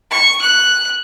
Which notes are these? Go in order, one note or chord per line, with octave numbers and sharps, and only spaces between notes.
C#6
F#6